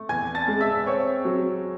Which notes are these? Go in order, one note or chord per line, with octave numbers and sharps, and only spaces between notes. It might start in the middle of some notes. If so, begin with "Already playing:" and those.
Already playing: A3
E2 G#5 G#6
A5 A6
G#3
E5 E6
C4 C#5 C#6
F#3